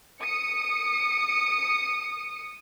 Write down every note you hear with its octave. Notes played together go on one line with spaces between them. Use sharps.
D#6 C#7